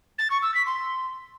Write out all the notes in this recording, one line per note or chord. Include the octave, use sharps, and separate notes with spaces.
A6
C#6
E6
B6
C6